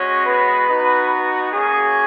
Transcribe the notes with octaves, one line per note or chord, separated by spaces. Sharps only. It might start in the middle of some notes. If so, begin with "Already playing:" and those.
Already playing: G#3 C#4 F#4 C#5
B3 B4
B3 D#4 F#4
A#3 C#4 F#4 G#4